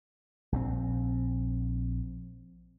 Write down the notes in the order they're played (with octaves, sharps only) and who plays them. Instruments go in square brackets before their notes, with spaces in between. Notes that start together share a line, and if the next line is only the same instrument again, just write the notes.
[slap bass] A#1 D3 C4